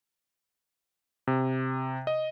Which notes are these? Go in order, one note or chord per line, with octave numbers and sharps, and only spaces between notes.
C3
D#5